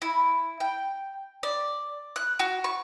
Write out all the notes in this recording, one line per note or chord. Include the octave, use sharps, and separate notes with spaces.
E4
G5
D5
F#6
F#4
C#6